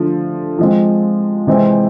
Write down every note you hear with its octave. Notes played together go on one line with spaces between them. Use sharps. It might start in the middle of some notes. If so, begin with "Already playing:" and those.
Already playing: D3 F3 A3
F3 G#3 C4
C3 E3 G#3 C4